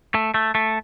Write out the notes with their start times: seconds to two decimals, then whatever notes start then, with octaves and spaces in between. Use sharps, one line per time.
0.15 A3
0.34 A3
0.55 A3